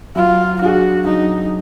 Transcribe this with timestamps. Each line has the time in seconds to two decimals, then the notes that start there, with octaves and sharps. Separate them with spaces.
0.16 F#3 F4
0.61 D4 F#4 G#4
1.06 F#3 D#4